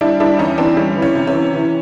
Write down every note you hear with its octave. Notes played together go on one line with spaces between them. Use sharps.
G3 D4 E4
G3 D4 E4
E2 C#4 D#4
E3 C4 D4
G3 C#4
E3
C#4
C3
C#4
E3
E3